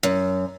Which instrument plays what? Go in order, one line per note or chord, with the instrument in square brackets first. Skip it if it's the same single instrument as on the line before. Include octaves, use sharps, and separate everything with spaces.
[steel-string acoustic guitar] F#2